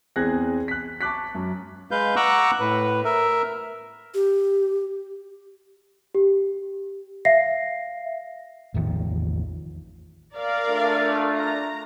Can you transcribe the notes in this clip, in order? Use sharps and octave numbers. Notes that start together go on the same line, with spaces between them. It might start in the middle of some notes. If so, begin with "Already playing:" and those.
E2 C4 G#4 F#6 G#6 A#6
F#6 B6
A5 C#6 D6 F#6 B6
F#2
G#3 B4 F5 G6
F#5 A#5 C#6 D6 E6 F#6
A2 B4
A#4 E5
G4
G4
E5 F5 A#6 C7
A1 E2 D#3 F3
A#4 D5 F5
A3 D4 F4
A#5